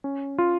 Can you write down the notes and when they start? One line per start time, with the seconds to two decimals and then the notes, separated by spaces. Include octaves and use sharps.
0.04 C#4
0.38 F4